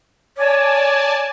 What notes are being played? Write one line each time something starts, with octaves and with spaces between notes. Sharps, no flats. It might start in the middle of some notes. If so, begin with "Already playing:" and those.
C#5 D5 G#5 A5